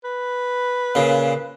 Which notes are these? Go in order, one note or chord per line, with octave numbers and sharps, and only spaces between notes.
B4
A#2 C#3